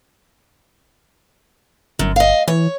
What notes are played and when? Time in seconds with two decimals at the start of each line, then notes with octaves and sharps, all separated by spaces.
1.99 G1 F#2
2.16 D#5 F5
2.48 E3 C#5